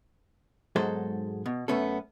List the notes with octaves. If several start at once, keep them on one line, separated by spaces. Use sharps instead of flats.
B1 G#2 F#3 G#3 A4 C5
B2
F#2 A3 B3 C#4 A4